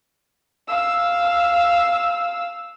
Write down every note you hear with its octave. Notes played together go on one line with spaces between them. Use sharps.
F5 E6